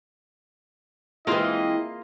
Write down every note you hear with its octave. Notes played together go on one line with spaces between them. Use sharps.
E3 G#3 A#3 C4 E4 F4 G#4 D#5